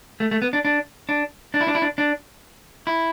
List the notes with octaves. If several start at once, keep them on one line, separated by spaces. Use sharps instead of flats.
A3
A3
B3
D4
D4
D4
D4
E4
D4
E4
D4
D4
E4